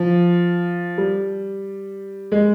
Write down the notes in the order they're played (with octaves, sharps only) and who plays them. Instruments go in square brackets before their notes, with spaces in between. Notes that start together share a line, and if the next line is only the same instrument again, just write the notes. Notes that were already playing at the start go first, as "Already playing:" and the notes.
Already playing: [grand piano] F3
G3
G#3